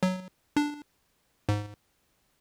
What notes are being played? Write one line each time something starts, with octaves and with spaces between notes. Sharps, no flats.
F#3
D4
G#2